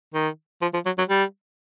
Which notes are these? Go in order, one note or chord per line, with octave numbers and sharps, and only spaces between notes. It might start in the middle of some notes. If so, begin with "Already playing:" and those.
D#3
F3
F3
F#3
F#3
G3